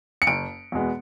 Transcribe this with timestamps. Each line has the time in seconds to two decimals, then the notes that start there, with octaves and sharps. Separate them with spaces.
0.22 C#7
0.27 F#1 D7
0.72 E2 B2 G#3 B3